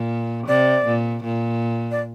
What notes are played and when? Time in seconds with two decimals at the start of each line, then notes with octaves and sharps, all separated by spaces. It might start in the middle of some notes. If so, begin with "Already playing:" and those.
Already playing: A#2
0.47 C3 D5
0.85 A#2
1.24 A#2
1.91 D5